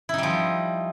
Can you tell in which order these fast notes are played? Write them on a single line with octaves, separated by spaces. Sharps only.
E4 D#4 G3 F3